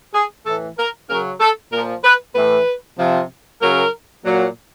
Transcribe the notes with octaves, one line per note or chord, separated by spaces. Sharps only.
G#4
A2 E3 A4
A#4
C#3 F#3 A#4
A4
A#2 F3 A#4
B4
A2 E3 B4
C3 F3
C#3 F#3 A#4
A#2 F#3